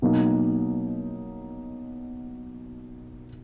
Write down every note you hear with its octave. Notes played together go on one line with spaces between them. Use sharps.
B2 F#3 A#3 D#4